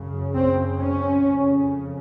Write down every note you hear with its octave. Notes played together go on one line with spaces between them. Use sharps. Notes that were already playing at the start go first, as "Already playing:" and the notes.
Already playing: F#2 C#3
C4
C#4
F2 C#3